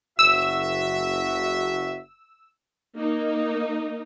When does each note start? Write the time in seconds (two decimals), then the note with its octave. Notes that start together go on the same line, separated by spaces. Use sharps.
0.19 F#1 F#4 E5 E6
2.95 A#3 D#4